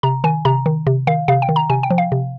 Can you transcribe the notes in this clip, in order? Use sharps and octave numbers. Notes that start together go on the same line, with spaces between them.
C3 A#5
D#3 G#5
C3 A#5
D#3
C3
D#3 F5
C3 F5
G5
D#3
A#5
C3 G#5
G5
F3
F5
C3